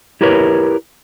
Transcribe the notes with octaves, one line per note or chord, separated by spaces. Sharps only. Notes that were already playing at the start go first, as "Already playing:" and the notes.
E4 G4 A#4 B4 C#5